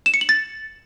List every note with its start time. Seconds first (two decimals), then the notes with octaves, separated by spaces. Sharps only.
0.06 E7
0.14 C#7
0.21 F#7
0.29 A6